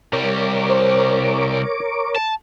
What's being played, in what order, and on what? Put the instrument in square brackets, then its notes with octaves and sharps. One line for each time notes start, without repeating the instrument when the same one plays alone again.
[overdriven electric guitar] C2 G3 [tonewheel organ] A#4 C#5 D6
[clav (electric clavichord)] C5
[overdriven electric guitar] A5